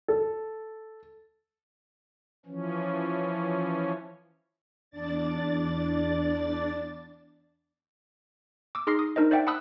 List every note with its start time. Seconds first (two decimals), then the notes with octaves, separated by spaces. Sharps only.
0.08 A4
2.46 E3 F3 C#4
4.91 E2 D4 D5 A6
8.75 D6 E6
8.87 D#4 G#4 C6 F6 A#6 C7
8.99 D#6
9.16 D4 D#4 A#4 C5 D#5
9.31 C5 D5 E5 F#5 G5
9.47 F#5 A5 B5 D#6 E6 F#6